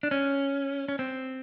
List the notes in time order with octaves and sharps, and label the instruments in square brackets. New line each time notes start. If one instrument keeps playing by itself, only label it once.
[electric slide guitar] D4
C#4
C#4
C4